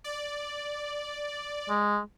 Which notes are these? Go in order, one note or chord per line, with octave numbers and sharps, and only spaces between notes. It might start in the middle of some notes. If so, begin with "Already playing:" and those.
D5
G#3